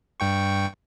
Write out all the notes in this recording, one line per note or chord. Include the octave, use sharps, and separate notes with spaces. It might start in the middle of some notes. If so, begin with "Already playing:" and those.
G2 G5 C#6